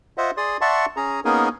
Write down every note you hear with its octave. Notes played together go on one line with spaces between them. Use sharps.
F4 C5 D#5 E5 F#5
G#4 D5 C6 D#6
D5 E5 F#5 A5 C6 C#6
C#4 G#4 A#5
A#3 B3 C#4 D#4 G#4 A#4